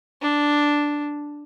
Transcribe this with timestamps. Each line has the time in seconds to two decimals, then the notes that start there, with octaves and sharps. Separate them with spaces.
0.21 D4